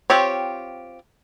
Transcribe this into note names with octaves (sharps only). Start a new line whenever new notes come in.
C4 F4 G4 C#5